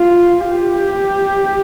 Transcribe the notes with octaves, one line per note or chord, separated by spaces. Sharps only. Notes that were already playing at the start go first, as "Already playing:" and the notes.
Already playing: F4
G4